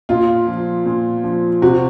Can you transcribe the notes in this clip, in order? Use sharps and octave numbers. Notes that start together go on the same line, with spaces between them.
A#2 F4
F3
A#2
F3
C3 F#4